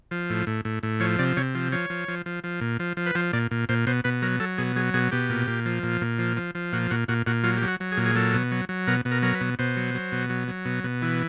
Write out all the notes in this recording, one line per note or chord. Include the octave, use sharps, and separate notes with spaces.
F3
A2
A2
A2
A2
F3 C#5
C3 D5
C3 C#5
F3
F3 C#5
F3
F3
F3
F3
A#2
F3
F3
B4
F3 C5
A#2 D5
A#2
A#2 C5
B2 C5
B2 B4
F#3 A#4
F#3 A4
B2 G#4
F#3 G#4
B2 G#4
B2 G4
A#2
A#2
F3
A#2
A#2
F3
F3
F3
A#2 F#4
A#2 F#4
A#2 F#4
A#2 F#4
F#3 F4
F#3 G4
F#4
F#3
G#4
A#2
G#4
F#3 A4
B2
F#3
F#3
B2 A#4
B2
A#4
F#3 A#4
B4
B2
B2 C5
F#3
F#3
B2
F#3
F#3
B2
B2
E3